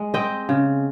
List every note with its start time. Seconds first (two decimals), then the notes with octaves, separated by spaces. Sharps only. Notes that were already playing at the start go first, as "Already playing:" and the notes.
Already playing: G#3
0.14 C4 D#5 G5
0.49 C#3